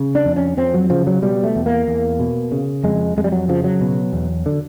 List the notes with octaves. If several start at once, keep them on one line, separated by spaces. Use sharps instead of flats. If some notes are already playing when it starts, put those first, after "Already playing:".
Already playing: C#3
D4
F2
C#4
F2 C4
F#3
C#3 F3
F#3
B2 G3
A3
E2
A#3
E2
B2
C#3
F2 G#3
F2 G#3
G3
F#3
C#3 F3
F#3
B2
E2
D3